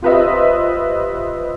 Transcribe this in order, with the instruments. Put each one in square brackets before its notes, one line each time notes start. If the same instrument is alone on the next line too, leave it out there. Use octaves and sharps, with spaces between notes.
[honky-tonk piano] F4 G4 B4 C5 D#5 E5